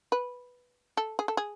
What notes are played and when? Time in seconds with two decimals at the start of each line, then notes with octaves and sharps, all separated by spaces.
0.12 B4
0.97 A4
1.19 G#4
1.28 A4
1.37 G#4